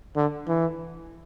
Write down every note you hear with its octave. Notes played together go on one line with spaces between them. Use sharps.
D3
E3